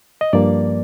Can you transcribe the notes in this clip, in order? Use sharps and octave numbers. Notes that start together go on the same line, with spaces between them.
D#5
G2 F3 A#3 D5